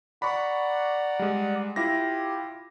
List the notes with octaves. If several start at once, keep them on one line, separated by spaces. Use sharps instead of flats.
D5 F#5 A#5 B5 C#6
G3 G#3
E4 F4 G4 A#6